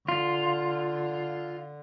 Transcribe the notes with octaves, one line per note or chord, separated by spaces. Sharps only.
D3 F4